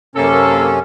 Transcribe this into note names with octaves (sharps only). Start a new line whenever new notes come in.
F#2 C3 A#3 C#4 A4